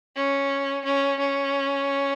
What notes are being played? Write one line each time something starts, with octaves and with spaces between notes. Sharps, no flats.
C#4
C#4
C#4